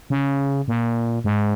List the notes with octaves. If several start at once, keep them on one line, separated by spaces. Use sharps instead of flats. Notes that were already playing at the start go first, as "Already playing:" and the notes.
C#3
A#2
G#2